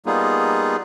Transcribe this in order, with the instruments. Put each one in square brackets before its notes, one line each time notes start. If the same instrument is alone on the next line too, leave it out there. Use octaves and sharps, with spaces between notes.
[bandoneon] G3 A#3 B3 D#4 F4 G#4